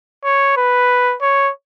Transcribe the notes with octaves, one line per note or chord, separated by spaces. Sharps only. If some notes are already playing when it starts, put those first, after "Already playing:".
C#5
B4
C#5